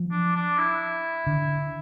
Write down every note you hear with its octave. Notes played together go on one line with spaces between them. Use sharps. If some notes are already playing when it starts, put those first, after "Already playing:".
Already playing: F3
D4
D4
E4
D3